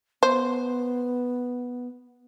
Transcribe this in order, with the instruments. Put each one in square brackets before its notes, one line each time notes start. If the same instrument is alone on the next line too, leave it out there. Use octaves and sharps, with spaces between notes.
[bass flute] B3 [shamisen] C5